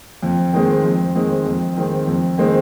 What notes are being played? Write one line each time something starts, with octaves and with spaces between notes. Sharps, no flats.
F2
D#3 G#3 C4
F2
D#3 G#3 C4
F2
D#3 G#3 C4
F2
D#3 G#3 C4